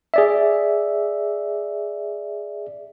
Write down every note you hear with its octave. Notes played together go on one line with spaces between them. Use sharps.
G#4 D5 E5